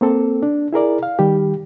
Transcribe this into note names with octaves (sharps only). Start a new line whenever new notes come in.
A#3 C4 A4
D4
E4 G#4 A#4 D5
F5
D#3 G3 G4